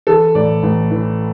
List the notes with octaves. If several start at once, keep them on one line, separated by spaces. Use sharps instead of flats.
E3 A4
A1 D5
A1
E3